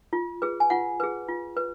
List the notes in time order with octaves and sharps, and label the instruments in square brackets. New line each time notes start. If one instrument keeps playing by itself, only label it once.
[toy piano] F4
G#4 B4
G#5
F4 F#5
G#4 B4
F4
B4